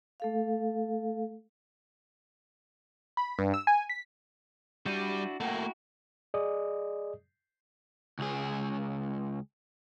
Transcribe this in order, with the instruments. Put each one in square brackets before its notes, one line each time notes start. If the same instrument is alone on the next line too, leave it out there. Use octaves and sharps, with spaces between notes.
[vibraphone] A3 A4 F5
[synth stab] B5
G2
E6
G#5
B6
[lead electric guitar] G3 [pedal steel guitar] D4 E4 F#4 [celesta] G6 D#7
[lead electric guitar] A3 A#3 [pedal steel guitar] E4 F#4 [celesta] F#5 G5
[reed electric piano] G#4 D5 D#5 D#6
[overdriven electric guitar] C#2 G#4